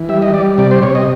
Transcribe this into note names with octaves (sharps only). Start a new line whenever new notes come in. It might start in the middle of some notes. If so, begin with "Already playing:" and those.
Already playing: E3
G3 E5
D#5
G3 D5
C3 D5
C5
C3 C#5
D#5